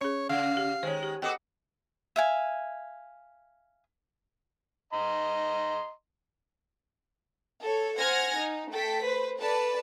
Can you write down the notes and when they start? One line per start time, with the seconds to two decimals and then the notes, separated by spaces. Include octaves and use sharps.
0.01 C#4 G#4 C#5
0.29 C#3 F5
0.57 G4
0.83 D#3 G#3 C5 C#5
1.03 G4
1.22 B3 F#4 A4 D#5 G5 D6
2.16 E5 F5 G#5
4.93 D#5 A#5 C6
7.62 A4 C#5
7.98 C5 F#5 G#5 F6 G#6 A#6
8.36 D#4
8.71 A3 A4 G5 B6
9.05 B4 C5
9.38 A4 B4 D5 A5